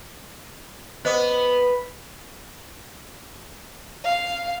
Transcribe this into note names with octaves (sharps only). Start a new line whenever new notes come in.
B3 C5 D#5 D6
F5